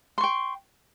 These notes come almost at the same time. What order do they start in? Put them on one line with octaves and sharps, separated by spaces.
C6 C#6 G5